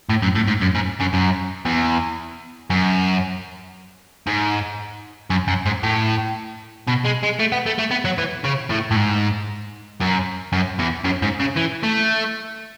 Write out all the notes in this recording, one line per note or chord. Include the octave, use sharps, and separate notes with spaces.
A2
F#2
A2
G#2
F#2
G#2
F#2
F#2
E2
F#2
G#2
F#2
F#2
G#2
A2
B2
G#3
G#3
A3
B3
A3
A3
B3
F#3
E3
C#3
A2
A2
G#2
F#2
F#2
E2
F#2
G#2
C#3
E3
A3